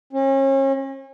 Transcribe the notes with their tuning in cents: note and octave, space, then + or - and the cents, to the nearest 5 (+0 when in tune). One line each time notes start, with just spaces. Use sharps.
C#4 -35